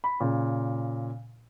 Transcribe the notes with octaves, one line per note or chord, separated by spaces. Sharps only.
B5
A#2 C#3